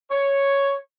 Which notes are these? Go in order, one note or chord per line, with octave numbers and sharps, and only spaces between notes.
C#5